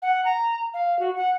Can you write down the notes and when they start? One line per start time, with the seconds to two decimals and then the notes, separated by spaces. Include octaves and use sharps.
0.02 F#5
0.25 A#5
0.74 F5
0.99 F#4
1.16 F#5